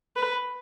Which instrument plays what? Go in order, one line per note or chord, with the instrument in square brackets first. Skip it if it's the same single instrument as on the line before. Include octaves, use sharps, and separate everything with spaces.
[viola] B4